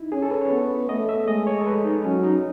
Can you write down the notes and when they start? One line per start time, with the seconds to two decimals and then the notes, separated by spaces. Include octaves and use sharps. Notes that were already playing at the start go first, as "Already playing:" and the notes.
Already playing: D#4 E4
0.12 C#4 G#4
0.22 A4
0.31 B4
0.41 C#5
0.51 B3
0.89 A3 D#5
1.09 E5
1.27 G#3 D#5
1.47 C#5
1.61 A4
1.66 B4
1.84 D#4
2.04 F#3 C#4
2.23 D#4